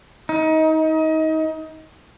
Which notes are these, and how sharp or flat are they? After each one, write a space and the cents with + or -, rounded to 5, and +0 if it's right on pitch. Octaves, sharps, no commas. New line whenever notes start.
D#4 +25